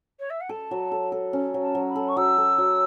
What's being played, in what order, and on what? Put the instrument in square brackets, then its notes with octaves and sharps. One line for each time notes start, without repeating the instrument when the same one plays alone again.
[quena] C#5
E5
F#5
[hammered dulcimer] A4 [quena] A5
[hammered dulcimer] F#3
A4
A4
C#4
F#3
[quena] A5
[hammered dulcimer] F#3
[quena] B5
[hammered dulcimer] A4
[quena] C#6
[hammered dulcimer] F#3 [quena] E6
[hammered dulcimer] A4
F#3